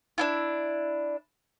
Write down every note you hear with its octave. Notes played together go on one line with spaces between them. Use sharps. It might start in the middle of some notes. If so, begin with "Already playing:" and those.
D4 E4 F4